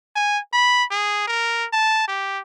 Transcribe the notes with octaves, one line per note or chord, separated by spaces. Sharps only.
G#5
B5
G#4
A#4
A5
G4